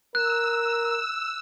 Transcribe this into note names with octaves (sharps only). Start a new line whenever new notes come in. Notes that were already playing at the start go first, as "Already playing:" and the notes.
A#4 E6 F#6